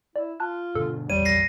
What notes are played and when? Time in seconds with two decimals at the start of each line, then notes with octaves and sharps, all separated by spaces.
0.16 E4 D5
0.40 F4 A5 F#6
0.75 B2 D3 A4
1.10 A#1 E2 A#2 G3 C#5 D#7
1.25 A#6 C7